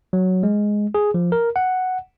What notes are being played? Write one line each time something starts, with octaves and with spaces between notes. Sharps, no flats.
F#3
G#3
G#4
F3
A#4
F#5